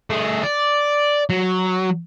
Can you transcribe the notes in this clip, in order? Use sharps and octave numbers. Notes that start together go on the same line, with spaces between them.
A3 G#4
D5
F#3